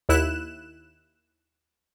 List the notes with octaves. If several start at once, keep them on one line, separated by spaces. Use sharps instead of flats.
D#2 E4 F#6 E7